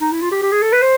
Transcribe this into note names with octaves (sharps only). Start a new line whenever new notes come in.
D#4
E4
F4
G4
G4
G#4
A4
B4
C5